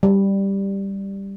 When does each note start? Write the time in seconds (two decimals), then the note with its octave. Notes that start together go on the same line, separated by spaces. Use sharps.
0.03 G3